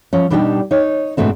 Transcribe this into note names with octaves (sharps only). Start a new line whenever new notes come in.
F3 C#4
B2 G3 D4 D#4 G4 G5
D#4 C#5
G#2 B2 A3 C4 D4